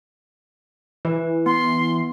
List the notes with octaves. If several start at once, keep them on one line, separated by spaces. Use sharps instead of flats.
E3 B4
B3 C6